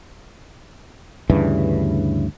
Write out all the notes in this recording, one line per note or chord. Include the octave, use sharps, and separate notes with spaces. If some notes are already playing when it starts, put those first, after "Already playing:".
D2 G2 C#3 E3